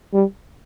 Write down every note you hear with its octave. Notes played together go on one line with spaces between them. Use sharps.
G3